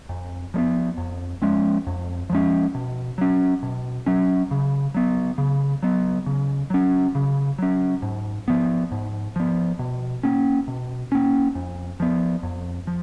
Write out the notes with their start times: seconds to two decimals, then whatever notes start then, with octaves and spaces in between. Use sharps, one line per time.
0.09 F2
0.54 F3 G#3 B3
0.98 F2
1.42 F3 G#3 C#4
1.87 F2
2.30 F3 G#3 C#4
2.75 B2
3.18 F#3 C#4
3.63 B2
4.06 F#3 C#4
4.51 C#3
4.95 F#3 B3
5.38 C#3
5.83 F#3 B3
6.26 C#3
6.70 F#3 C#4
7.15 C#3
7.59 F#3 C#4
8.02 G#2
8.48 F3 B3
8.92 G#2
9.36 F3 B3
9.79 B2
10.23 A#3 C#4
10.68 B2
11.12 A#3 C#4
11.55 F2
12.00 F3 B3
12.43 F2
12.87 F3